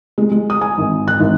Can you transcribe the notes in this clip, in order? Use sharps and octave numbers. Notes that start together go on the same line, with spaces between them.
G#3
G#3
D#6
G#5
G#1
F#6
G#1